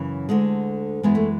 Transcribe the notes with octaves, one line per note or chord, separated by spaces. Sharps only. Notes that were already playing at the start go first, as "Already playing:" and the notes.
Already playing: F#2 C#3 E3
D2 D3 G#3
F#2 E3 G#3 B3
A3